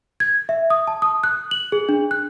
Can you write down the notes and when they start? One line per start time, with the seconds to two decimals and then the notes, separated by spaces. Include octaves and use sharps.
0.20 G#6
0.49 E5
0.70 D#6
0.87 A5
1.02 D#6
1.24 F#6
1.51 F#7
1.72 G#4
1.89 D4
2.11 F#6